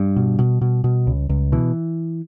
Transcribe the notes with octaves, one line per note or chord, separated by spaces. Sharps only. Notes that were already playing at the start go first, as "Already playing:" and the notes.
Already playing: G2 G3
B2
B2
B2
B2
C#2
C#2
B2 E3